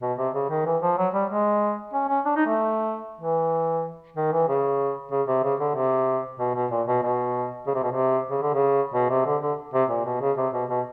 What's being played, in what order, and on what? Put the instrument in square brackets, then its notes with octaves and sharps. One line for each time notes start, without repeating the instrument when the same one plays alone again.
[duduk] B2
C3
C#3
D#3
E3
F3
F#3
G3
G#3
C#4
C#4
D4
D#4
A3
E3
D#3
E3
C#3
C#3
C3
C#3
D3
C3
B2
B2
A#2
B2
B2
C#3
C3
B2
C3
C#3
D3
C#3
B2
C3
D3
D3
C3
A#2
B2
C#3
C3
B2
B2